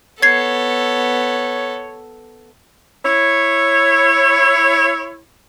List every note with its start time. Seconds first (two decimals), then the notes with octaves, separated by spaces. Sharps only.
0.23 B3 A4 C#5 G#6 C7
3.05 E4 C#5